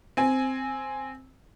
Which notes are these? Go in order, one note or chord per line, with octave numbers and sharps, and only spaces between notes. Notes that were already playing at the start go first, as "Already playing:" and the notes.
C4 G#5